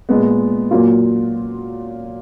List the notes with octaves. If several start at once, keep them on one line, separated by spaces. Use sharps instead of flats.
A#2 G#3 B3
A#2 F#3 A#3 F4